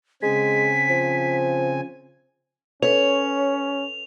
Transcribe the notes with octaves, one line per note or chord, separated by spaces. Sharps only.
C#3 G#3 C4 G#5 B6
F3
C#4 A4 B4 C#5 F7